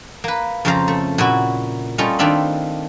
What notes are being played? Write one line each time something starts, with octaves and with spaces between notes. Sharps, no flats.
A#3 B4
F2 C#3 F4 C5 F5 A#5
A3
A#2 E4 F#4
G3 A3 C#4 F4 D#5
D#3 C4 D4 F4 E5 B5